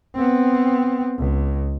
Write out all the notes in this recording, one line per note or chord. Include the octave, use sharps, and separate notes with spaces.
B3 C4
C#2